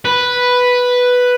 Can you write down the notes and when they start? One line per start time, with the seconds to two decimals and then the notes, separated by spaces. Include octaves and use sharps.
0.05 B4